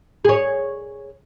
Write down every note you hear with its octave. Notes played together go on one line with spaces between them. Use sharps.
G#4 C#5